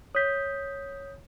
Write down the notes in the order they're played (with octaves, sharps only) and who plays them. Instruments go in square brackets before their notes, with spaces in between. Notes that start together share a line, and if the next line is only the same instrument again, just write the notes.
[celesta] C#5 B6 [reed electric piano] D#6 G6